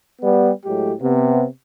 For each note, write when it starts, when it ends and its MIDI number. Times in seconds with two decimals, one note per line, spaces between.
0.22 0.50 55
0.22 0.50 59
0.65 0.93 45
0.65 0.93 54
0.65 0.93 56
0.65 0.93 57
0.65 0.93 67
1.01 1.44 48
1.01 1.44 59